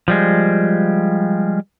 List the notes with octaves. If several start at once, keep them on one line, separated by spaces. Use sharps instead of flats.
F3 G3 G#3